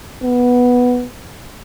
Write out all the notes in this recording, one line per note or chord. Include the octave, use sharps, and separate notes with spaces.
B3